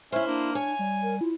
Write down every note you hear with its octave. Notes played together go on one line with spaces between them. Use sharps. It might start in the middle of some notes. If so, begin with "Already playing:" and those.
C#4 E4 C5 E5 F6
A#3 D4
C#5 G#5
G3
A#4
E4 F4